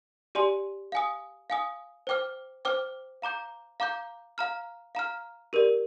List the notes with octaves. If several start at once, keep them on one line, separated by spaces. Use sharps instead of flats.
G4 D5 G#5 C6
F5 G#5 D#6
F5 G#5 D#6
C5 G5 D6 F6
C5 G5 D6 F6
F5 A#5 D6 G6
F5 A#5 D6 G6
F5 A#5 F6
F5 A#5 F6
G4 A#4 D5